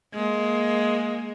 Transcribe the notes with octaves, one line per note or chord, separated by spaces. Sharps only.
G#3 A#3